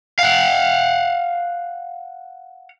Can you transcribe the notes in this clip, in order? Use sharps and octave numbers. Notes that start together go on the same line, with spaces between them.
F5 F#5